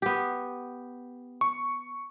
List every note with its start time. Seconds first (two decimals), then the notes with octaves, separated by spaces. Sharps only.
0.02 B3 G4
1.41 C#6